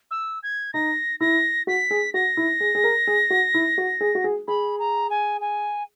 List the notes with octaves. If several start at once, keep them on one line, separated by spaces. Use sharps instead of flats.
E6
G#6
D#4 A#6
E4 A#6
F#4 B6
G#4
F#4 A#6
E4
G#4
G#4
A#4
G#4
F#4
E4
F#4
G#4
F#4
G#4
G#4 B5
A#5
G#5
G#5